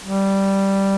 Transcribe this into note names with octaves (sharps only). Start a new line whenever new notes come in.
G3